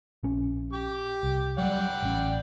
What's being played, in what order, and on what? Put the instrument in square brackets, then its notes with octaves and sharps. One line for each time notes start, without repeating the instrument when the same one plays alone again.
[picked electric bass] A#1 C#4
[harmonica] G4 D6
[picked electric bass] C2
[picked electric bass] F#3 G3 [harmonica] D5 F#5 G5
[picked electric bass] A1 C#4